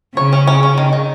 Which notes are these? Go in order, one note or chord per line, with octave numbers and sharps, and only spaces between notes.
C#3 C#5
C#4
C#4
C#4
D#3
D#3